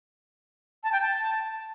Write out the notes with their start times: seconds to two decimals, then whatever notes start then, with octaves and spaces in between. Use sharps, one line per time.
0.84 A5
0.92 G5
1.01 A5